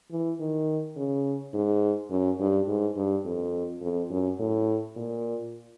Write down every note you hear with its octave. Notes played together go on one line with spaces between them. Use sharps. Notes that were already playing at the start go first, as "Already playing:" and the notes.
E3
D#3
C#3
G#2
F#2
G2
G#2
G2
F2
F2
F#2
A2
A#2